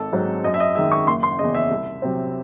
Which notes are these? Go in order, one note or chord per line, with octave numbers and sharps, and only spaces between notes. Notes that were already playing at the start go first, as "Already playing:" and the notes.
Already playing: G#1 A4
G#2 F#3 C4
F#2 D#5
E5
D#5
D#3 G#3 E5
C#6
F#1 C6
C6
E2 C#3 D#5
E5
C2
C3 F#3 C4